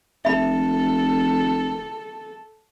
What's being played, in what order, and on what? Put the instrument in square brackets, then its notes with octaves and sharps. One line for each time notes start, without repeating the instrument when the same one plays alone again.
[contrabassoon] F1 [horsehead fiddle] A4 [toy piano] E5 B5